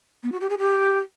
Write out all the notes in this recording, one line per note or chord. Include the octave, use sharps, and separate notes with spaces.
B3
F#4
G4
G#4
G4